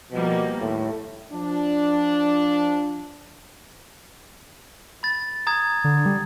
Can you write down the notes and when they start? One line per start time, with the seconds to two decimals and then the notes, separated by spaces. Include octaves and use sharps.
0.12 B2 F3 G3 A#3
0.61 D#2 A2
1.33 F3 D4
5.03 B5 A6
5.47 A#5 D#6 G#6
5.84 D3
6.06 G3